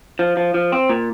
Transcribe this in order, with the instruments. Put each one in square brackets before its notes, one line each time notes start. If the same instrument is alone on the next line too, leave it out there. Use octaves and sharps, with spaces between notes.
[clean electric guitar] F3
F3
F3
C4
A#2